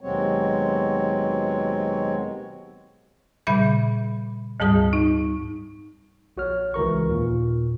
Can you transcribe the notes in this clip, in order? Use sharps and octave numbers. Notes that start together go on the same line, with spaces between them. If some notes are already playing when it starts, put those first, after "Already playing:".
D#2 B2 F#3 G#3 C4 C#5
A#2 C#3 G3 E5 B5 G6
D2 G#2 G3 G#4 D#6
D#4
A#1 F#4 C#5 F6
C#2 E3 A#4 C#6
D#2 A#2